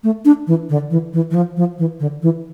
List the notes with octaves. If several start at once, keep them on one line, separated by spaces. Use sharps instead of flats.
A3
D4
E3
D3
E3
E3
E3
F3
F3
E3
D3
E3